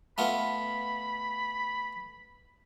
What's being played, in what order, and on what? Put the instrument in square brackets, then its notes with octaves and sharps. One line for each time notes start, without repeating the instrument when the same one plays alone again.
[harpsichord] A3 B3 F4 [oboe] B5